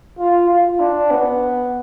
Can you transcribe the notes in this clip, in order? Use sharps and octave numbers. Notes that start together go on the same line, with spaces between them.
F4
F4
D4
B3